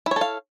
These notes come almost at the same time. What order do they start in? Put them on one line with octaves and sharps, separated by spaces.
E4 C#5 A4 F5